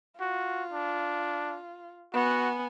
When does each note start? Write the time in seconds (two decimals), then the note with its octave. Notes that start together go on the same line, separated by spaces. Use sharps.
0.20 F4 F#4
0.72 D4
2.14 B3 F#4 G#5